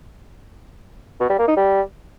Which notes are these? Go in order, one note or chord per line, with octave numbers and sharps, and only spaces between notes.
B2
G3
A#3
D#4
G3